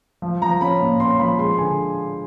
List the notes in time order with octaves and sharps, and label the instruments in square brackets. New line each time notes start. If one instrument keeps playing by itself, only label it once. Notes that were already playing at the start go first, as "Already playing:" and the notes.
[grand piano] F3
F3 A#5
C#4 B5
A#2
C#4 C6
F3 B5
G#3 C6
D3 G#5